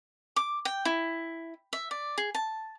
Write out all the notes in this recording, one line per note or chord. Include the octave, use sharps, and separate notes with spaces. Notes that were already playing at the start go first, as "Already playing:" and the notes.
D6
G5
E4
E5
D5
G#4
A5